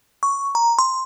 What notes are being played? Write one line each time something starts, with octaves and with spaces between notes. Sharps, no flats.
C#6
A#5
C6